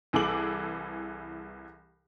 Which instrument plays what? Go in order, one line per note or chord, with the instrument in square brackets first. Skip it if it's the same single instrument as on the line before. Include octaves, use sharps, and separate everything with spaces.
[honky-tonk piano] C2 E3 G#4 A4 D6 F#7